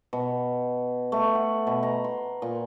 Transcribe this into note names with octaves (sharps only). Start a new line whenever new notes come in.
B2
A3
F#5
B2
A#5
C6
A#2